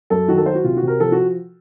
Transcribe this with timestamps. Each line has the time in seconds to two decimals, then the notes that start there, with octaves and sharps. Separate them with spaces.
0.10 F#2 A4
0.28 D#3 F#4
0.37 A4
0.46 F#3 C5
0.55 F#4
0.64 C3 F4
0.77 F#4
0.82 C3
0.88 A#4
1.00 F3 A4
1.12 F#4